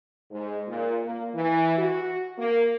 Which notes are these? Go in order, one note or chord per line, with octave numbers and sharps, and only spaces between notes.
G#2
A#2
A#3
E3
F#4
A#3